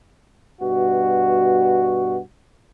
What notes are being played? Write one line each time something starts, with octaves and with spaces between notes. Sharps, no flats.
G2 B2 F#4